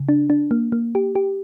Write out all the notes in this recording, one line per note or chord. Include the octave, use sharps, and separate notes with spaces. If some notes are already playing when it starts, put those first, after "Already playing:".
Already playing: C#3
D4
D4
A#3
A#3
G4
G4